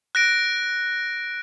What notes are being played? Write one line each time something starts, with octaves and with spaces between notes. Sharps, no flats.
F#6 A#6 D7